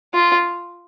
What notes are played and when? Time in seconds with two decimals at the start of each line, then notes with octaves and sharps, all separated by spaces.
0.14 F4